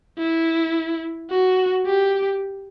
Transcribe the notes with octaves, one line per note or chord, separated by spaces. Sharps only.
E4
F#4
G4